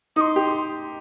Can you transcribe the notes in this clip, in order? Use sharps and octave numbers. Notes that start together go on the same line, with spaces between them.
D#4 C6 D#6
G4